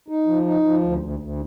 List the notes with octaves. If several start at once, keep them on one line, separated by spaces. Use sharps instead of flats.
D#4
F3
D#4
F3
D2
D2
D2